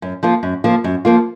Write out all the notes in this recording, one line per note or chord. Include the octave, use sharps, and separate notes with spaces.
F#2
F3 A#3 F4
F#2
F3 A#3 F4
F#2
F3 A#3 F4